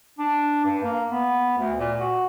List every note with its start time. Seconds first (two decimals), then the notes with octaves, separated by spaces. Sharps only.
0.19 D4
0.65 G2
0.83 A#3
1.11 B3
1.58 D2
1.77 A#2
2.00 F#4